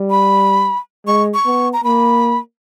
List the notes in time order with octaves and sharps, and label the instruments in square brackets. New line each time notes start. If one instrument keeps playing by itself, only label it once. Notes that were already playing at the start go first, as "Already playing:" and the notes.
Already playing: [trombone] G3
[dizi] B5
[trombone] G#3 [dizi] C#6
[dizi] C#6
[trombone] B3
[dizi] A#5
[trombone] A#3 [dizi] B5